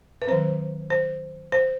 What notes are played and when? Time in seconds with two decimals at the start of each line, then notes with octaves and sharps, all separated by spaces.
0.22 B4
0.27 D#3 F#3 C4 C5
0.90 C5
1.52 C5